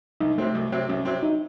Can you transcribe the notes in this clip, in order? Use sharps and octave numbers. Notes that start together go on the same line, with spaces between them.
C2 D#4
C3 F#3 A3 C4
C2
C3 F#3 C4
C2 C#4
C3 F#3 C4
D#4